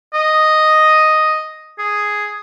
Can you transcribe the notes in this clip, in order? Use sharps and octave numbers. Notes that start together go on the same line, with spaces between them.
D#5
G#4